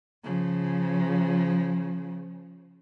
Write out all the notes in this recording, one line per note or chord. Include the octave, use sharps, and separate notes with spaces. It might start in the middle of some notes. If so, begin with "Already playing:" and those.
C#3 F3